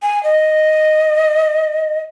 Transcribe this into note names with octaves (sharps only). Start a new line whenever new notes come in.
G#5
D#5